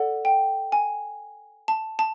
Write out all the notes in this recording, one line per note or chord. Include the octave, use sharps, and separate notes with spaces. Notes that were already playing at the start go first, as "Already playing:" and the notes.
Already playing: A4 D5 F#5
G5
G#5
A5
A5